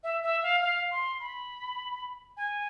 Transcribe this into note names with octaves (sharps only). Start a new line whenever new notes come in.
E5
E5
F5
F5
C6
B5
G#5